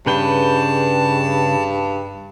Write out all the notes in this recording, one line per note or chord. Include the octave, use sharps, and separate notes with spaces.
G2 C#3 B4 G5 A5